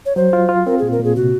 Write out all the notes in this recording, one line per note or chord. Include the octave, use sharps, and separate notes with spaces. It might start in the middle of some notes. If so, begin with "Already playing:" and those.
C#5
F#3 C5
F4
F4
C4 A#4
A#2 G#4
A#4
A#2 G#4
C3 F#4